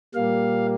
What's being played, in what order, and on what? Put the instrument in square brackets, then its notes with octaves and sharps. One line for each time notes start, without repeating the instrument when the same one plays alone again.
[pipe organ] A#2 G3 A#3 F5